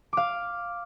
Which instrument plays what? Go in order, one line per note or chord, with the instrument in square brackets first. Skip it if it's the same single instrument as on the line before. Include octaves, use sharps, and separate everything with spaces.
[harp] F5 D6